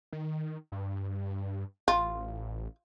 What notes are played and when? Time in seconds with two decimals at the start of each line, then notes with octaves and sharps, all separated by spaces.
0.13 D#3
0.72 G2
1.88 A1 F4